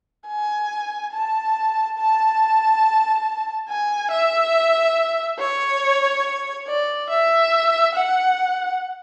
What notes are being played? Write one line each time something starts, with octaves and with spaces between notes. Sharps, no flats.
G#5
A5
A5
G#5
E5
C#5
D5
E5
F#5